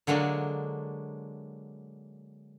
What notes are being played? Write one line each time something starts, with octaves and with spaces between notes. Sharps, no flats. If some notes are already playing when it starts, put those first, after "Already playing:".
D3 F#3 G#3 A#3 D4